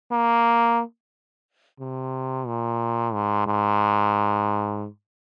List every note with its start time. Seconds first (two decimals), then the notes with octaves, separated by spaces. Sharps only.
0.12 A#3
1.80 C3
2.47 A#2
3.14 G#2
3.47 G#2